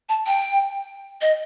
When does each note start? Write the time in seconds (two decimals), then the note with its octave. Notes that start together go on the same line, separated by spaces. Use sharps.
0.09 A5
0.27 G5
1.21 D#5